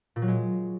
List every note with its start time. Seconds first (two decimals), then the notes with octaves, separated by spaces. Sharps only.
0.16 A#2
0.22 F#3
0.28 G#3